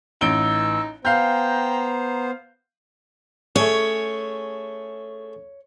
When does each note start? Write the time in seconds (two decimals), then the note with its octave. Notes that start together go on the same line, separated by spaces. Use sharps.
0.21 A1 D#4 E6 D7 G7
1.05 B3 C5 F5 G5 A#5 G6
3.56 A3 C#4 G#4 C#5